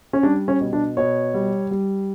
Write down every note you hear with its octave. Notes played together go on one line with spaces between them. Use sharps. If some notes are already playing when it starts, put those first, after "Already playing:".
C#4
G3 D4
C#4
B2
D4
B2 C#5
G3
G3